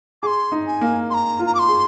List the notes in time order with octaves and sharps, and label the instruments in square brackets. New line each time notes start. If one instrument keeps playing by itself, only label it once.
[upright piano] G#4 [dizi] C6 D6
[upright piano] D#4
[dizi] G#5
[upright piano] A#3
[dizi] C6
A#5
[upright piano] F4
[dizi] A#5
D6
C6
[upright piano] G#4